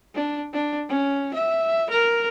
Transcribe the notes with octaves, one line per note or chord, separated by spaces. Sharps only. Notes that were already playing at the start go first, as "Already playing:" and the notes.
D4
D4
C#4
E5
A#4